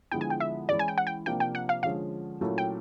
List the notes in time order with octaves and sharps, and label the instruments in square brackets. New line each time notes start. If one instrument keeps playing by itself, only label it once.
[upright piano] D3 F3 G#3 B3 E4 [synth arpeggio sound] G5
[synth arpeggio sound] G#5
G5
E5
[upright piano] E3 G#3 C#4 E4 [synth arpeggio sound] D5
[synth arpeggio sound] G#5
G5
F#5
G5
[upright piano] C3 F3 A#3 D4 [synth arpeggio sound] G5
[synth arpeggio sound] G5
F#5
F5
[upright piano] D3 F3 G#3 C#4 [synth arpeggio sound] F5
[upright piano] A#2 F#3 A3 C#4 E4
[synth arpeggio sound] G5